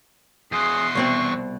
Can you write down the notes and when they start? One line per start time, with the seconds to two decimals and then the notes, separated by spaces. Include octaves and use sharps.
0.52 E2 F#4 G#4 C6 C7
0.95 C2 B2 C4 C#6